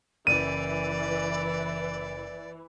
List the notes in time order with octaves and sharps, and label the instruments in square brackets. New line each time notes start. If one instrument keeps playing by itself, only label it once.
[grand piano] F#1 [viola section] E3 [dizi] D5 [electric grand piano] D#7